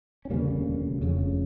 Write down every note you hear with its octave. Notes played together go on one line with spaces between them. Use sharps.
C#4
E1 D2 C#3 G3 A#3
F1 F2 C#3